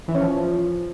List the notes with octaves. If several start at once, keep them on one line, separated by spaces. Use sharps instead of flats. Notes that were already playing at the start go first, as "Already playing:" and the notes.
E3
C#4
F3